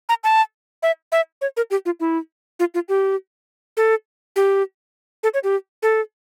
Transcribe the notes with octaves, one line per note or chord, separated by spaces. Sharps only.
A#5
A5
E5
E5
C#5
A#4
G4
F4
E4
F4
F4
G4
A4
G4
A4
C#5
G4
A4